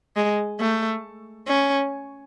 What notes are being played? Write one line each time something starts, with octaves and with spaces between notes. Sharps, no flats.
G#3
A3
C#4